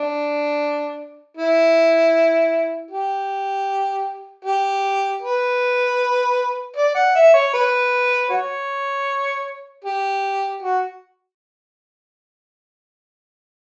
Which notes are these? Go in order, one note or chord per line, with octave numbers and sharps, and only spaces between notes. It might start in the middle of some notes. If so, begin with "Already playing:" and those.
Already playing: D4
E4
G4
G4
B4
D5
F#5
E5
C#5
B4
F#4 C#5
G4
F#4